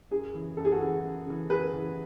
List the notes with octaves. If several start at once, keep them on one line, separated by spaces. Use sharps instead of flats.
F#2 G#4
C#3 E3
F#2 A4
G#4
F#4 A4
C#3 E3
F#2
C#3 E3
F#2 G#4 B4
C#3 E3